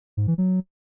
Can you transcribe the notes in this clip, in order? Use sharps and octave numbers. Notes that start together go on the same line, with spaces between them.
G#2
E3
F#3